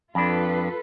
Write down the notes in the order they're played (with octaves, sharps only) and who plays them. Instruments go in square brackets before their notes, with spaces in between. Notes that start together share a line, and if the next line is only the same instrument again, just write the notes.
[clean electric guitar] F2 D4 [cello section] F4 A4 B4 [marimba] A5 B5